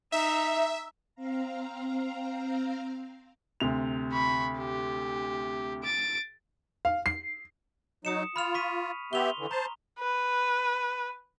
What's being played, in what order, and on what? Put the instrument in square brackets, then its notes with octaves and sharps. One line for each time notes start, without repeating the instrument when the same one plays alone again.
[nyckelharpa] D#4 [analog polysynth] E5
[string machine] C4 F5 A#5
[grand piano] D2 C3 F7
[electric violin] B5 C#6
G4
A6 D7
[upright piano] F5
C7
[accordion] F#3 D#4 [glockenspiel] D#6 C#7 E7
[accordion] F4 [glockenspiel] B5 F6 F7
[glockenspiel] C#6 B6 D#7
[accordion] B3 G4 E5 [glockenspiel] C6 F7 G7
[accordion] D3 E3
[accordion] C5 A5 [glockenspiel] A#5
[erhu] B4